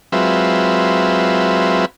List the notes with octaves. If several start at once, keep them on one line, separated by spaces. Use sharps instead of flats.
F#3 G#3 C4 F4 B4 E5